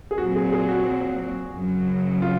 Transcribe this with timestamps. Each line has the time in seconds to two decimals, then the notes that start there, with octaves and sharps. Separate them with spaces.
0.11 G#4
0.18 A#2 F#3 C4 F#4
0.36 G#4
0.52 G#4
0.69 F#4
1.54 F#2 C#3 F#3
2.22 F4